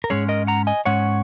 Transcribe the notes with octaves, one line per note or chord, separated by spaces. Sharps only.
A#4
G#2 G#3 C#4 G#4 C#5
A#4 D#5
F#5 A#5
D#5 G#5
G#2 G#3 C#4 C#5 F#5